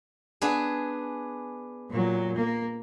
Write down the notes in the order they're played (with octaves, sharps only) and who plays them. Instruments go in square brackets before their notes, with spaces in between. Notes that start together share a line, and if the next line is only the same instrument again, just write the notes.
[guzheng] B3 D4 G#4
[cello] A#2 F#3
A#3